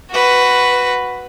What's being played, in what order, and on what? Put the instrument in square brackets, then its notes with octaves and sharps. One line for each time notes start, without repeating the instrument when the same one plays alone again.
[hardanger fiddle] F#4 B4